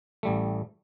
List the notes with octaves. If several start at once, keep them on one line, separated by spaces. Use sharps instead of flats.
A1 G3 A3